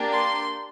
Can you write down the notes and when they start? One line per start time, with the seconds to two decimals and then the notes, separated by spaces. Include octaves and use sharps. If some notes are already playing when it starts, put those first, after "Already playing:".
Already playing: A#3 D4 G4
0.13 C6